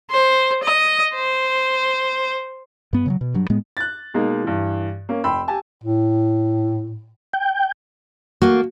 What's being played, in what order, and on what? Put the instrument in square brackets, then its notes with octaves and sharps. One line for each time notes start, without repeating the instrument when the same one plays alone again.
[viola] C5
D#5
C5
[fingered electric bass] G2 B3
C#3 E3 F#3
B2
G2 F#3
A2 G#3 B3
[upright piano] F#6 A6
B2 G#3 A#3 D#4
G2 E3
A#3 C#4
F1 G5 B5 C6 E6
G4 G#5 A5
[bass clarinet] A2
[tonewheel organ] G5
[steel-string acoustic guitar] A3 A#3 [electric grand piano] F#4